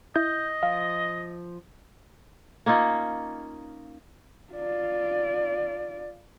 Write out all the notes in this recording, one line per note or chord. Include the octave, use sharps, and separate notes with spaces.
E4 D#5 G6
F3 F5
A#3 C#4 D#4 F4
F4 D5